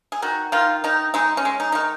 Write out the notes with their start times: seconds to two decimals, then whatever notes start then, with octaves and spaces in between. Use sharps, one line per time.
0.12 G#4
0.22 D#3 F#4
0.52 D#3 F4
0.84 D#3 D#4
1.14 G#3 D#4
1.37 C#4
1.45 G#3
1.60 D#4
1.72 D#3 D#4